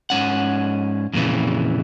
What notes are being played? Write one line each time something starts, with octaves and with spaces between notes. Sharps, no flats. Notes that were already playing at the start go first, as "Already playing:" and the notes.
G#2 C#4 F#5
F2 A#2 C#3 E3